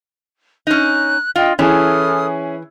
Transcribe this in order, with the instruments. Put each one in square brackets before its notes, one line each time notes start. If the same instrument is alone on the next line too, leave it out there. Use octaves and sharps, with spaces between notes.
[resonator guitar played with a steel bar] C#4 D#4 [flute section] F#6
[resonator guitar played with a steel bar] F4 [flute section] D#5 G5
[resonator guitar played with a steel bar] E3 [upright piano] C#4 E4 G#4 [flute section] A4 D#6 F6